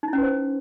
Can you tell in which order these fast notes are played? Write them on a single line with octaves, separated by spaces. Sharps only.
D#4 E4 C#4 B4 C5